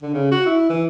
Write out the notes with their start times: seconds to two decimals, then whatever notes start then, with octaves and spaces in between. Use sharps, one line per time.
0.02 D3
0.14 C#3
0.31 F#4
0.46 E4
0.69 E3